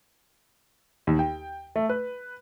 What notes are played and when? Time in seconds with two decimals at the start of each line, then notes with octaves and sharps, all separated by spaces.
1.07 D#2
1.19 G5
1.76 A3
1.89 B4